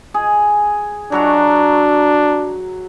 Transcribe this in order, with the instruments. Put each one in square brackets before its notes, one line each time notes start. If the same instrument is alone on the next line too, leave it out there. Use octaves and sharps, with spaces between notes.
[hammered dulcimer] G#4
[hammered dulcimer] F#3 F#4 A#5 [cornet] D4